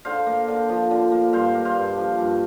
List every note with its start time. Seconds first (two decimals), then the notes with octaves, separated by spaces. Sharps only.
0.05 D3 C5 F5
0.27 A#3
0.48 D3
0.69 F3
0.91 D3
1.11 A#3
1.33 G2 C5 F5
1.54 A#3
1.65 C5 F5
1.75 G2
1.98 F3
2.18 G2